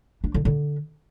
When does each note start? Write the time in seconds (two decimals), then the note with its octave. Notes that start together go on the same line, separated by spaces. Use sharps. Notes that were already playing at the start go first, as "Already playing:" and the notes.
0.24 D4
0.34 D3
0.45 D3